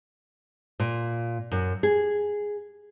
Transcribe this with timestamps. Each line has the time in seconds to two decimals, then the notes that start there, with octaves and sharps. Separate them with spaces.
0.80 A#2
1.51 F#2
1.83 G#4